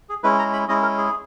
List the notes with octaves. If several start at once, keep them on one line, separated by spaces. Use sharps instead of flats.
G#4
G#3 C#4 E4 B4
A#5
B5
G#3 C#4 E4 D#5
A#4
G#4